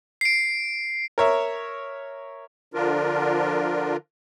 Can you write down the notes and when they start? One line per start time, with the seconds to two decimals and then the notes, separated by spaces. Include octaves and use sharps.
0.21 C7 D7
1.18 A#4 C#5 E5
2.74 D3 F3 D4 F4 A#4